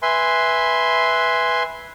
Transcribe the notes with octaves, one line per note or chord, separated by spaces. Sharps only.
B4 E5 G#5 C6